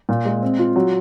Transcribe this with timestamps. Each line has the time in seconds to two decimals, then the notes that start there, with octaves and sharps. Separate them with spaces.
0.09 A#2
0.25 G#3
0.42 C4
0.59 F4
0.76 F#3